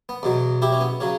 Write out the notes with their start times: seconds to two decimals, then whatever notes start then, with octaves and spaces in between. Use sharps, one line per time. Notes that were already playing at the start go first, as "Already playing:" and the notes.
0.09 B3
0.23 E2 B2 F#3
0.62 E4 G4
0.72 C#4
0.81 B3
1.00 C#3 F#3 C#4